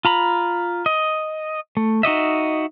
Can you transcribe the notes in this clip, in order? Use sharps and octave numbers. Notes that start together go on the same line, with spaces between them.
F4 A#5 B5
D#5
A3
D#4 F#4 D#5 E5